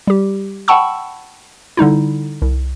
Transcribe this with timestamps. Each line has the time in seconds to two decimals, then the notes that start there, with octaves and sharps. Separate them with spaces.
0.07 G3 G4
0.68 F#5 G5 A5 B5 C#6 E6
1.77 D3 G3 D#4 E4
2.42 C2